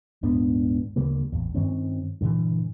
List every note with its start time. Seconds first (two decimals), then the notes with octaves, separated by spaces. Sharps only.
0.23 D#1 G#2 B3 D4
0.96 D2 C#3 G3 A#3
1.32 A1 E2
1.55 G2 D#3 C4 C#4
2.21 G2 A#2 D3 E3